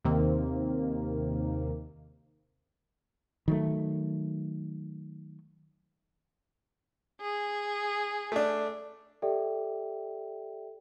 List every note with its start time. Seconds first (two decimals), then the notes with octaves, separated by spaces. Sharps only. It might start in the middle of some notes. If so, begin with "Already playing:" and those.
0.05 D#2 C3 D#3 A#3 C4
3.48 D#3 F#3 A3
7.21 G#4
8.32 A3 D4
9.22 G4 A4 D5 E5 G5